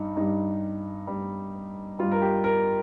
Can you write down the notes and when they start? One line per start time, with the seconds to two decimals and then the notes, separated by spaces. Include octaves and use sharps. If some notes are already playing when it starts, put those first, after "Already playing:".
Already playing: G2 G3 D#4
0.16 G2 G3 D#4
1.07 G2 G3
1.99 G2 G3 F4
2.12 A#4
2.22 G4
2.44 A#4